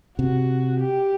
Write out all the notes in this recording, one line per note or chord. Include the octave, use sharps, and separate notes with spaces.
C3 F#4
G4